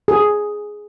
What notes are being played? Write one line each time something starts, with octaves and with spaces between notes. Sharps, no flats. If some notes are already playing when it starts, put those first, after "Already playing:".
G#4